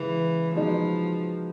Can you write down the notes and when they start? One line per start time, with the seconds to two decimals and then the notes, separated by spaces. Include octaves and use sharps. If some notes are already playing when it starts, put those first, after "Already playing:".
Already playing: C#3 E3 G#3
0.55 B2 F3 G#3 B3 D#4